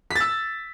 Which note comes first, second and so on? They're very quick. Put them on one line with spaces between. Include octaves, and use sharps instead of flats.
B6 A6 E6